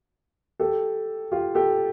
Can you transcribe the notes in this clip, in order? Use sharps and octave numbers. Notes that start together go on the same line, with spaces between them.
G4 A4
F4 G4
G4 A4